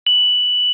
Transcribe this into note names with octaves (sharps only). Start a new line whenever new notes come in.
F#7